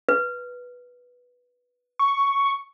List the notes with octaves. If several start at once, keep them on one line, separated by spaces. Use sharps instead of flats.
B4
C#6